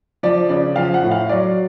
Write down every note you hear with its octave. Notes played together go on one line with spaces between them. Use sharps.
F3 D5
C#3 D5
F3 F5
F#5
A2
F5
F#3 D5